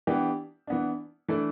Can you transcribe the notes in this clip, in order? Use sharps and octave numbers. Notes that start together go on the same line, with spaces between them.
E3 B3 D4 G4
E3 B3 D4
E3 A3 D4 A4 D5